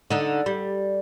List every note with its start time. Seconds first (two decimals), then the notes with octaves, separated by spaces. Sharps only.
0.10 D3 D#4
0.46 G3